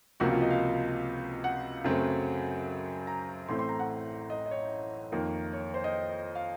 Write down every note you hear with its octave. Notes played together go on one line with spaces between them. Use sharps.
C#2 C3 F3 A#3 F#4
F4
D#5
F5
F#5
F#2 C#3 F#3 A3 C4
A#5
A1 A2 A3 C4 C6
C6
A#5
F#5
D#5
D#5
C#5
F2 D#3 A#3
C#5
C5
D#5
F5